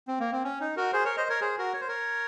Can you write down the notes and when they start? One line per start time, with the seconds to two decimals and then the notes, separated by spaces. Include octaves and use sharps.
0.08 C4
0.20 A#3
0.32 C4
0.44 C#4
0.60 D#4
0.77 F#4 A#4
0.93 G#4 C5
1.05 A#4 C#5
1.17 C5 D#5
1.29 A#4 C#5
1.41 G#4 C5
1.58 F#4 A#4
1.74 C#5
1.81 C5
1.88 A#4 C#5